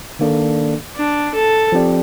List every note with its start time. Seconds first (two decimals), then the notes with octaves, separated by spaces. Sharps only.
0.19 D#3 A#3 D4 A4 D5
0.96 D4
1.34 A4
1.72 F3 C4 G4 D5